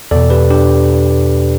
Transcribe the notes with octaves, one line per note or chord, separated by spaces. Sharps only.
E2 B2 A4 D5
G4 B4
D4 G4